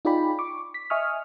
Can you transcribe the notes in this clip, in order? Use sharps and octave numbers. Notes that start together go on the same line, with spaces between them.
D#4 F4 G#4 D5 G5 B5
C#6 D6
B6
D#5 E5 G#5 C#6 D#6 F6